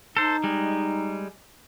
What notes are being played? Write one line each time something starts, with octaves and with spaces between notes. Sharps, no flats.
D#4 A4 C5
G3 G#3